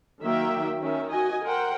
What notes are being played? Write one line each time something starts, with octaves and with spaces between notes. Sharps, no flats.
D#3 F#3 A#3 E5 G5
D#3 C#4 E5
F#4 D#5 G#5
A#4 C5 F#5 G5